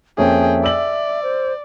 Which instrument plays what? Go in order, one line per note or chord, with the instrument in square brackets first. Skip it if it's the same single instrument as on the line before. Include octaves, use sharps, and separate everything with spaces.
[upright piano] F2 A#3 C#4 [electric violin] G#4 G5 [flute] E5
[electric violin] D5 [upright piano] E6 F#7
[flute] C5